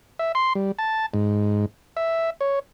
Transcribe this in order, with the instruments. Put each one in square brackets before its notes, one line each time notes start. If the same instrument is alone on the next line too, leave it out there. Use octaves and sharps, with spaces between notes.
[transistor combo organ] E5
C6
G3
A5
G#2
E5
C#5